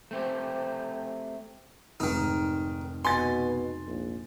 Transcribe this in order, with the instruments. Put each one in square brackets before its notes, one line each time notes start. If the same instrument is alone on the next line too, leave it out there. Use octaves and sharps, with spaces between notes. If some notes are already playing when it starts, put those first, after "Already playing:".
[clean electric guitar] A3 C4 G4 [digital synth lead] C5
[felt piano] F1 G#2 [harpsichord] D#3 D#4
[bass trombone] B2 [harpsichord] G#5 [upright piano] C6 A6
[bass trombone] A#1